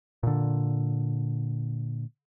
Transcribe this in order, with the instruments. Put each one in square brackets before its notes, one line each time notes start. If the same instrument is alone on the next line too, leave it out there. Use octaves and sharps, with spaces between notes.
[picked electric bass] A#2 D3